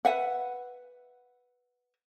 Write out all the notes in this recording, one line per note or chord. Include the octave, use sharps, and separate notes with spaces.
B4 E5 F#5